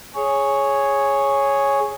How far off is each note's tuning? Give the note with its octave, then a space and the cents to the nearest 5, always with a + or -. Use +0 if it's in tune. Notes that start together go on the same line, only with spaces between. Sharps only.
G#4 +0 C#5 +0